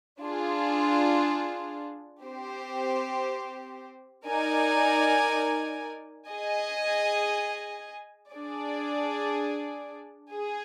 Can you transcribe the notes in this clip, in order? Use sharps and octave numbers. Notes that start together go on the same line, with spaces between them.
D4 F4 G#4
C4 G4 C5
D#4 A#4 D5 G#5
G#4 D#5 G#5
D4 G#4 D5
G#4